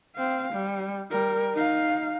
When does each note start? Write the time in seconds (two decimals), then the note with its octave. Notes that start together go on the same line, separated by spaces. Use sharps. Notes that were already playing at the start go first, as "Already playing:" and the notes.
0.16 C4 F5
0.54 G3
1.11 G3 A#4
1.54 D#4 F5